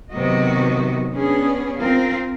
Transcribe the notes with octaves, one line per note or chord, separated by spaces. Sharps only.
C3 D#3 F#3 B3 F#4 D#5
B3 C#4 D4 G#4
C4 F4 A#4 F5